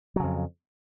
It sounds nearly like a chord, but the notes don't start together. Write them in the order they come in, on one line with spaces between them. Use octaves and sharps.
F#3 C#3 F2